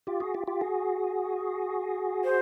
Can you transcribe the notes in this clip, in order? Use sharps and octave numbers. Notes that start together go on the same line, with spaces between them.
F4 G4
F#4 G#4
F4 G4
F4 G4
F#4 G#4
C5